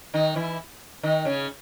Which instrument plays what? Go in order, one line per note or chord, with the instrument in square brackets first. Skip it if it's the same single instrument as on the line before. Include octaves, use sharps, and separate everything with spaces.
[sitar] D#3 D#4
E3 E4
D#3 D#4
C#3 C#4